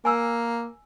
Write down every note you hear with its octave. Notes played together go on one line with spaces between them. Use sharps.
A#3 G#5 E6